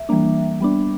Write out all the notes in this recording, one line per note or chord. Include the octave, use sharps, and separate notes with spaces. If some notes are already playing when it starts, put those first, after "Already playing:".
Already playing: E5
E3 G3 A#3 D4
G3 B3 D4